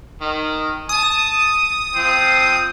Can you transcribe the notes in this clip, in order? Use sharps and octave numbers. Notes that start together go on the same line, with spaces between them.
D#3
A5 D#6
F3 C4